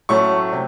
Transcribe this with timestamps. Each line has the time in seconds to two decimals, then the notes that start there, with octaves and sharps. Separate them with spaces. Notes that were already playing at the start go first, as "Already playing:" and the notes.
0.09 A2 F#3 A3 C#4 C#6
0.52 C3